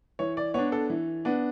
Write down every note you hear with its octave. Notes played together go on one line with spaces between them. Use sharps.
E3 C#5
D5
B3 D4 C#5
A4
E3
B3 D4